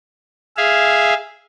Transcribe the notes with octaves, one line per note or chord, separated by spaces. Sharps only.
G#4 E5 F5